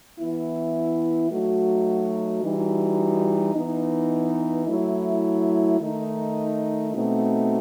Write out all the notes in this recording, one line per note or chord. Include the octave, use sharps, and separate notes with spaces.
E3 B3 E4
F#3 A3 D#4 F#4
E3 G3 D#4 F#4
E3 B3 D#4
F#3 A3 E4
D#3 A3 D#4
B2 A3 C4 D#4 F#4